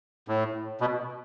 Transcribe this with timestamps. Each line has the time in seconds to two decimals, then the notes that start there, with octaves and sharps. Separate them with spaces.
0.28 A2
0.81 B2